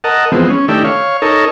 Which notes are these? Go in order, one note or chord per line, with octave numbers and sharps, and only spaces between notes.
A#4 D#5 F#5 A5
E3 F3 G#3 B3 C4
C#4
D#3 A3 D4 E4 G4
C#5 F5
D#4 A4 A#4 C#5